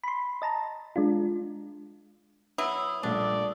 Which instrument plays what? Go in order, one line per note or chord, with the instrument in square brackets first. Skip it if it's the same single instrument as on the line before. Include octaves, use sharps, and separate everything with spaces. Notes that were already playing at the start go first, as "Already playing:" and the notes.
[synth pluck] B5 C6
D#5 A5 A#5
G#3 D4 F4
[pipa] F#3 B3 E4 [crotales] D#6 E6
[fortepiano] A#1 G2 A3 [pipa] D4 [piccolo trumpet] D5